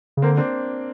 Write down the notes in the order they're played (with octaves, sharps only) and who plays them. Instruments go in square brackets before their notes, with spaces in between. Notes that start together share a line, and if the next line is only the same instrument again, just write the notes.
[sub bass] C#3
[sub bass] D3 [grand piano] A#3 C4
[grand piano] C4 D4